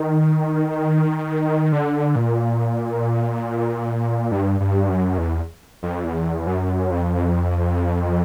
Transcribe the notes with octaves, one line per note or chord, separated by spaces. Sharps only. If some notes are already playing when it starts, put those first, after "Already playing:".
Already playing: D#3
D3
A#2
G2
G2
F#2
E2
F2
E2
F#2
F2